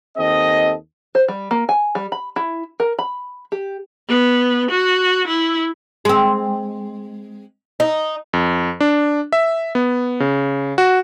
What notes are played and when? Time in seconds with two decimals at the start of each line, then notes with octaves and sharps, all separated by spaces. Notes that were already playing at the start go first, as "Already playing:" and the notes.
0.17 D#2 C4 A4 D#5
1.15 C5
1.28 G3
1.51 A#3
1.69 G#5
1.95 G3
2.12 B5
2.36 E4
2.80 A#4
2.99 B5
3.52 G4
4.09 B3
4.71 F#4
5.28 E4
6.05 G#3 C4
7.80 D#4
8.33 F2
8.81 D4
9.32 E5
9.75 B3
10.20 C#3
10.78 F#4